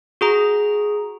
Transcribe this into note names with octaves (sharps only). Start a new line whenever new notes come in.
F#4 G#4 A#5